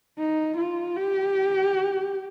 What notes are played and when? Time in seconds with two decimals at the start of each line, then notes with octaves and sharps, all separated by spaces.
0.18 D#4
0.57 F4
0.96 G4